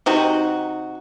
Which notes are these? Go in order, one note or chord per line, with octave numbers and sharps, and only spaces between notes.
C3 D#4 F#4